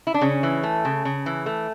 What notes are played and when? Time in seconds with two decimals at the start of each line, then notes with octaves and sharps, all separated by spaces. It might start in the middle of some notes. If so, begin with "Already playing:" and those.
0.07 E4
0.14 D4
0.21 C#3 C#4
0.43 E3
0.63 A3
0.85 C#3
1.05 C#3
1.26 E3
1.46 A3